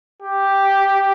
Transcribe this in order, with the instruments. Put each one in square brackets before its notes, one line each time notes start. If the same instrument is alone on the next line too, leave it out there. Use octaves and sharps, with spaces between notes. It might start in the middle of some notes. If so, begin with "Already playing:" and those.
[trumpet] G4